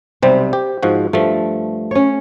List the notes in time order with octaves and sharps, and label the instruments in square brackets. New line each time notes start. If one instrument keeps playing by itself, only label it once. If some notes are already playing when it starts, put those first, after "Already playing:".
[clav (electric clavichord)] B1 C3 G3 [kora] C5
[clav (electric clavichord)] G4
G#2 F3 F#4
[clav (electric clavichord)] G2 F3 [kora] A3
[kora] C#4 C#5